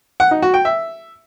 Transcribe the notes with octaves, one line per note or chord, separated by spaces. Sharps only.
F#5
D#4
F#4
G5
E5